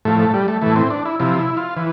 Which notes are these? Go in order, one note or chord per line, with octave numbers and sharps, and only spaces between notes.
A2 F3 A3
A3
G3
A3
A2 E3 A3
C4
D4
E4
C3 F3 E4
E4
F4
E3